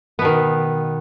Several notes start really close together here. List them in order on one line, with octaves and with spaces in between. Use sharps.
B3 B2 D#3